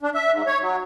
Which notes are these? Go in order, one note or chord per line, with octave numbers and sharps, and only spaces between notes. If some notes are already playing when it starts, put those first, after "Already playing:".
D4
E5
G#2
C#5
F#3